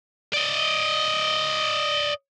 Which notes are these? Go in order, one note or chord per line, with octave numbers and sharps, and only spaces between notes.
D5 D#5